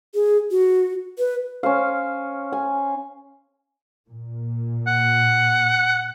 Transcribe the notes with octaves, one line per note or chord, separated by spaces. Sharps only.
G#4
F#4
B4
C#4 C5 F5
G#5
A#2
F#5